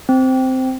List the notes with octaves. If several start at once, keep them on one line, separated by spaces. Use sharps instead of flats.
C4